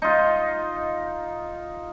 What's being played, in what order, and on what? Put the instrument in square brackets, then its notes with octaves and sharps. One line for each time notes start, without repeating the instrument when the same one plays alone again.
[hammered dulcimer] D#4 F4